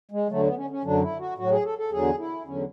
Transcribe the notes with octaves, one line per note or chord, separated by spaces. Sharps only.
G#3
D2 D3 F#3 A3
B3
C#4
C#4
F#2 D3 F#3 D4
E4
F#4
A2 F#3 F#4
G#4
A4
A4
E2 D3 F#3 G#4
E4
E2 D3 F#3 C#4